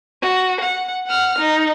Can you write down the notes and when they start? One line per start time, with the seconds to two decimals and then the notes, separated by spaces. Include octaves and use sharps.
0.22 F#4
0.61 F#5
1.07 F#5 F6
1.39 D#4